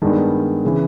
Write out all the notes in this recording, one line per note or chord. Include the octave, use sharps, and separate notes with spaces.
G2 D#3 G#3 B3 D4
C#3 E3